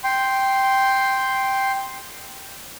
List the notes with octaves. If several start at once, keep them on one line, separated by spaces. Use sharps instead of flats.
G5 C6